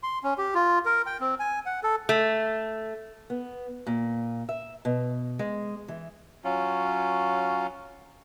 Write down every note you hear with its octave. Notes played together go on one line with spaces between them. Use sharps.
C6
C#4
G4
F4
A#4
G5
C4
G#5
F#5
A4
A3
B3
A#2
E5
B2
G#3
E3
F#3 C#4 F4